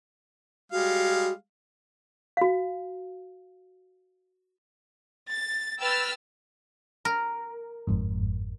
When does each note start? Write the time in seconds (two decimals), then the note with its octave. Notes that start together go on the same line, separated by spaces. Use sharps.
0.72 G3 G#3 F#4 F5
2.37 F#4 F5
5.29 A6
5.80 B4 G5 E6 F6 A6
7.05 A#4
7.87 G1 F2 G#2